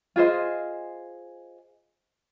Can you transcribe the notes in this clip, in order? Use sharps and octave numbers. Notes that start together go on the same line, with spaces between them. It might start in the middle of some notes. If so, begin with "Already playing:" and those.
F4 G#4 C5 D#5